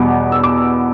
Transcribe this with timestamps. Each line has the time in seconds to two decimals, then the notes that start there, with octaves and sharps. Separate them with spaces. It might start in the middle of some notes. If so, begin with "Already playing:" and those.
Already playing: E2 B2 G3 B3 D6
0.32 E6
0.43 D6